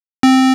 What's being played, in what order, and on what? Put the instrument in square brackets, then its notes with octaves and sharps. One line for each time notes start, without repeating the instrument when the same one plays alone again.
[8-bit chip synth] C4